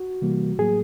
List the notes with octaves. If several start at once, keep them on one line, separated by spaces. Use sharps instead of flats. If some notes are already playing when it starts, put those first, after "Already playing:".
Already playing: F#4
C3 E3 G3 A#3
A2 F#3 A#3 G#4